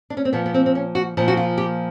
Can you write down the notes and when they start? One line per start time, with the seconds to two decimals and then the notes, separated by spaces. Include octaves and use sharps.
0.10 D4
0.17 C#4
0.25 C4
0.33 A#2 F3 B3
0.46 B3
0.54 C4
0.66 C4
0.75 C#4
0.95 F#4
1.17 A#2 F3
1.28 F#4
1.37 F4
1.58 G4